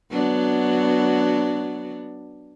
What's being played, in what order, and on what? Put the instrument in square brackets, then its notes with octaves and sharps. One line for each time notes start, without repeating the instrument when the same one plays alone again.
[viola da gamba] F#3 B3 D4